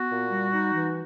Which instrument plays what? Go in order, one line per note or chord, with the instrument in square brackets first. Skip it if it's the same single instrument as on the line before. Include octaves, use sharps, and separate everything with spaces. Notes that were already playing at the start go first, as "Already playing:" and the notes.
Already playing: [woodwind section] B3 F#4
A#2
G3
D#4
E3